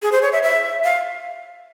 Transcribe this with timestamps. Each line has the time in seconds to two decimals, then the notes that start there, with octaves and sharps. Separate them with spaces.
0.02 G#4
0.12 C5
0.22 C#5
0.32 E5
0.43 E5
0.84 F5